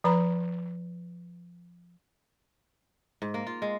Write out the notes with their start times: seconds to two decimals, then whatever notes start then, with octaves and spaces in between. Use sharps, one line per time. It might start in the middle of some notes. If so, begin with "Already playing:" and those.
0.04 F3 B4 A#5 B5
3.22 G#2
3.34 A#3
3.47 F4
3.62 G#3